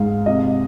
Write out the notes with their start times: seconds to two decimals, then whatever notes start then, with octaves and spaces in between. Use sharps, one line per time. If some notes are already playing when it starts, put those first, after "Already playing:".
Already playing: G#2 G#3 F5
0.26 C3 D#5